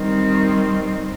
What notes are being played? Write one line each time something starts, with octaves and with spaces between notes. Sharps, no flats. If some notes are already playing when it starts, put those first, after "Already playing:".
Already playing: D#3 G3 C4